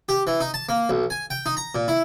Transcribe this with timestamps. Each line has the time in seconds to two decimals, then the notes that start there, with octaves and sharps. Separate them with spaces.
0.09 G4
0.27 E3
0.41 D#4
0.54 A5
0.69 A#3
0.90 B1
1.10 G#5
1.30 G5
1.46 D#4
1.57 A#5
1.75 A#2
1.88 E4